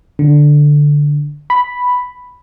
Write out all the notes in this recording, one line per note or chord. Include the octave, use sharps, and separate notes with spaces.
D3
B5